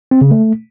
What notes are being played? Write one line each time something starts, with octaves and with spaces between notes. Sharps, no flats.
C4
C#3
A3